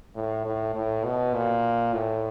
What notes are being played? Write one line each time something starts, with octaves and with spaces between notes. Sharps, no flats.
A2
A2
A2
B2
A#2
A2